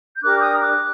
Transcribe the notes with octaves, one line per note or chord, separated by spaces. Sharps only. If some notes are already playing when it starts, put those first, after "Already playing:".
G6
D4 G4 A#4 D6 F#6
D#6 G6
D6 F#6